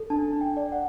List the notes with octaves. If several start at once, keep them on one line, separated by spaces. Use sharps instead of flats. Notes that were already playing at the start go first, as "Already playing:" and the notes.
Already playing: A4
D4 A5
D4
G5
D5
F#5